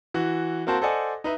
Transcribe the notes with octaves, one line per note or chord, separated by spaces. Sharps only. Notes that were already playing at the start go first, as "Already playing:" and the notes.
E3 F#4
A#3 C4 F#4 C5 A5
A4 C5 D5 D#5 F#5 G#5
D#4 B4 E5